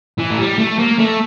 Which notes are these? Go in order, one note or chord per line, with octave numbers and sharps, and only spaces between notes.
E3
A3
G3
A3
A#3
A3